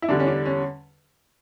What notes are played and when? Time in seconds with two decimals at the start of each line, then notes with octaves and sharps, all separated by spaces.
0.02 E4
0.08 E2 D3 G3 D4
0.20 C#4
0.27 D4
0.46 C#4